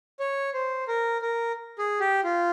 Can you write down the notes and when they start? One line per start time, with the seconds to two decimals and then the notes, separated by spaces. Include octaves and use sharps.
0.20 C#5
0.54 C5
0.88 A#4
1.22 A#4
1.79 G#4
2.00 G4
2.24 F4